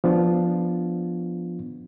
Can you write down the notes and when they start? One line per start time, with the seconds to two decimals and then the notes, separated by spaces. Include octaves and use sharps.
0.04 F3 B3 D4 F4